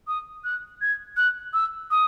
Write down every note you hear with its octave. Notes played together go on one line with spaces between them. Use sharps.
D#6
F#6
G#6
F#6
E6
D#6